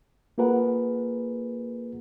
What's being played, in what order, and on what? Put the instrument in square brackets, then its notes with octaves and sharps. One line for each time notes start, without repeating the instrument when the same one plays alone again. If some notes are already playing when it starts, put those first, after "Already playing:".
[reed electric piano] A#3 F4 G#4 A#4 B4 F#5